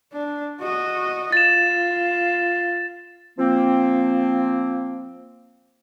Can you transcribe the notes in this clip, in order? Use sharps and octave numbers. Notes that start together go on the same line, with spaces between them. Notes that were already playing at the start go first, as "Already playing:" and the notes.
D4
F#4 D#5
F4 A6 E7
F3 A#3 C4